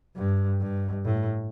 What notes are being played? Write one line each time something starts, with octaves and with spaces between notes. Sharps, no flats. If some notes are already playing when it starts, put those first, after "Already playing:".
G2
G2
A2